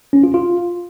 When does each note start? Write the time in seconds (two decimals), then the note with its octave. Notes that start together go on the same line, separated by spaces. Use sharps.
0.13 C#4
0.24 F4
0.34 F4